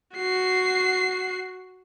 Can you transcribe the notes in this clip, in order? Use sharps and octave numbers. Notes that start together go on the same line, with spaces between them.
F#4 C7